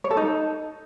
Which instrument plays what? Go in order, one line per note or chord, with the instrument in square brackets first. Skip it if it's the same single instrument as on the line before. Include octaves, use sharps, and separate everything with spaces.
[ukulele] C#5
A4
D#4